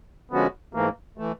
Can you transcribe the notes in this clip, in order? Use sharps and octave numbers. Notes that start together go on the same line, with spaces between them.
D3 F3 G#3 B3 C#4 F#4
G#2 E3 A3 A#3
E3 A3